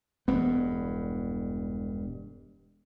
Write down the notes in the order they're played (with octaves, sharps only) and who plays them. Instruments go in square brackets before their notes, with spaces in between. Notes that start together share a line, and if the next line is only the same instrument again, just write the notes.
[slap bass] E1 G2 B3